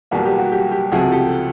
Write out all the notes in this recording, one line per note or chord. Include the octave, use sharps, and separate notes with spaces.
E2 B2 G3 A#3 F#4 G#4
G4
F#4
G4
G4
C#2 C3 F3 A3 F#4 G#4
G4 A4